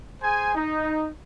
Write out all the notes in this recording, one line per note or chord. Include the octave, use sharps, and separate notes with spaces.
G#4 C5 G#5
D#4